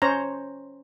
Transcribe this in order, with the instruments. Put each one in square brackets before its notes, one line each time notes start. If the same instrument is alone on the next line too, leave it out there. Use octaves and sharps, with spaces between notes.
[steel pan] C#4 C5 C#5 A#5